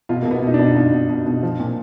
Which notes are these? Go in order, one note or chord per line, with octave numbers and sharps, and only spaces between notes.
B2 F4
B2 A#3
B3
B2 D#4
D4
B2
D#4
B2 F4
B2
B2
B2
F3
A#2